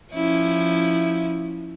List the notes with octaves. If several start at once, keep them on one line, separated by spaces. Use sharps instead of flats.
F3 C#4 E4